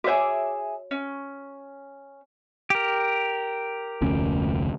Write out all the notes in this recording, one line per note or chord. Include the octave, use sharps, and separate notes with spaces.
F#4 G#4 C#5 E5 D6
C#4
G4 A#4
F1 D2 C#4